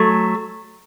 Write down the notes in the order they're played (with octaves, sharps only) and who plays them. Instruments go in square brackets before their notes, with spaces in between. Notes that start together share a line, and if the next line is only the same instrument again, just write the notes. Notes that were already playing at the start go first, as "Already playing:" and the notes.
Already playing: [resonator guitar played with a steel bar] F#3 A3